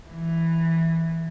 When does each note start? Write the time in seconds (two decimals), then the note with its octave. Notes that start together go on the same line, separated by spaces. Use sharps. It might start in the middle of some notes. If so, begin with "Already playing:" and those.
0.09 E3